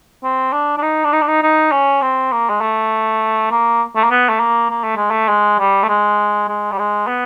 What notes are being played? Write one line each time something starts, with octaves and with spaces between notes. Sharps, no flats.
C4
D4
D4
D#4
D4
D#4
D4
D#4
D#4
C#4
C4
A#3
G#3
A3
A#3
A3
A#3
B3
A3
A#3
A#3
A3
G#3
A3
G#3
G3
A3
G#3
G#3
G3
G#3
B3